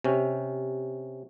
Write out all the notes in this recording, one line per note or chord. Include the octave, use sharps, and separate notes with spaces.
C3 C#4